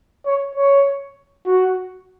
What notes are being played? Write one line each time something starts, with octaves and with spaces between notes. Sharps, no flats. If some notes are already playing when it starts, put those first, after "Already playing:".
C#5
C#5
F#4